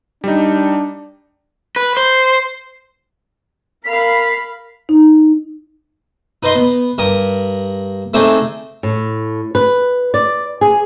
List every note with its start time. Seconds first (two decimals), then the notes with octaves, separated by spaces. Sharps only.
0.24 G3 D4 D#4
1.76 B4
1.97 C5
3.85 A#4 F5 B5 B6
4.89 D#4
6.43 D#4 B4 D#5 C6
6.55 B3
6.98 G2 A#4 D#6
8.14 A3 C4 D4 D#4 G#4 A4
8.83 A2
9.55 B4
10.14 D5
10.61 G#4